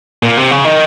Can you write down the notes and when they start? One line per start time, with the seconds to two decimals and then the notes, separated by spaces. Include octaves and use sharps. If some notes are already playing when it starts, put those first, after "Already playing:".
0.23 A#2
0.37 C3
0.51 C#3
0.64 D#3